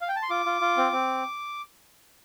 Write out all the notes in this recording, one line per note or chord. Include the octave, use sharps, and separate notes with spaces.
F5
G5
A5
C6
F4 D6
F4
F4
C4
C4